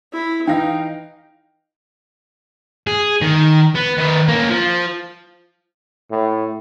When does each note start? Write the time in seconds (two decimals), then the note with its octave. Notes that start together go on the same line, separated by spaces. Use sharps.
0.13 E4
0.47 E3 D#4 F5 G5 A#6
2.87 G#4
3.22 D#3
3.75 B3
3.97 D#3 B4
4.28 A#3 C#4
4.50 F3
6.11 A2